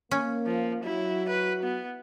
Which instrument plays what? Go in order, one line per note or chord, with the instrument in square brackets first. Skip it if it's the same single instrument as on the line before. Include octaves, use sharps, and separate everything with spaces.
[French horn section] A#3 [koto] C#4
[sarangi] F3
[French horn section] F#3 F#4 [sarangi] E4
[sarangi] B4
B3